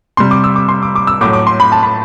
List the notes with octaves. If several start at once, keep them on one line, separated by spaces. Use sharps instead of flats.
C3 G3 C6
D6
E6
D6
C6
D6
D6
E6
A2 F#3 A3 D6
D6
C6
B5
A5
B5